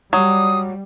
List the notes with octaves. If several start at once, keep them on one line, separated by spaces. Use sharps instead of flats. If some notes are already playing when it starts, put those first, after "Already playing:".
F#3 G3 D#6